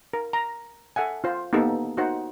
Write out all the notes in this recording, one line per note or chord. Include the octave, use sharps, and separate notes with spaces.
A#4
A#5
A4 E5 F#5 G#5
F4 C5
A#3 B3 D#4 G4 A4
D#4 F#4 A#4 C5 F#5